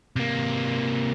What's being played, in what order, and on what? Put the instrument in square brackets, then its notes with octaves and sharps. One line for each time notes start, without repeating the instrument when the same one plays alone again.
[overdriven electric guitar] C3 A#3